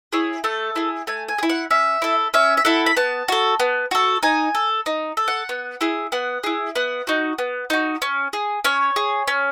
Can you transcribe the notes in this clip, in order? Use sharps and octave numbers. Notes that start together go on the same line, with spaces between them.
E4 G#4 C#5
A3 A4
E4 G#4
A3 G#5
G#5
G#4
E4
F#5
C#4 E5
E4 A4
C#4 E5
E5
E4 A4 F#5
B5
B3 A5
F#4 A4
B3
F#4 A4
D#4 G#5
A4
D#4
A4
F#5
B3
E4 G#4
B3 F#5
E4 G#4
B3 F#5
D#4 F#4
B3
D#4 F#4
C#4
G#4
C#4 C#5
G#4
C#4